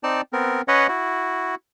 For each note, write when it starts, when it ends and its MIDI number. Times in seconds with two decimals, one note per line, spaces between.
0.03 0.21 60
0.03 0.21 63
0.03 0.21 74
0.03 0.21 81
0.33 0.62 59
0.33 0.62 60
0.33 0.62 70
0.68 0.87 61
0.68 0.87 71
0.68 0.87 73
0.68 0.87 75
0.68 0.87 78
0.88 1.55 64
0.88 1.55 66